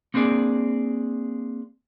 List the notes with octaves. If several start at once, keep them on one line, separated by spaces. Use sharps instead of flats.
A#3 C4 D4 G#4 D5